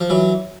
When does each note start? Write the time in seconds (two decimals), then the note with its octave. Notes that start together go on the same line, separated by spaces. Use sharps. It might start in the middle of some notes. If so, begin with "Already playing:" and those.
0.01 F3
0.10 E3 F#3